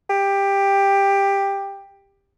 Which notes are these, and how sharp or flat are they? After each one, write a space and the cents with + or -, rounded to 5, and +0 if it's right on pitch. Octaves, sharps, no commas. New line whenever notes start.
G4 +15